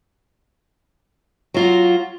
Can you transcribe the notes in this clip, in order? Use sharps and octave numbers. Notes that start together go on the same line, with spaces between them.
F#3 F4 F#4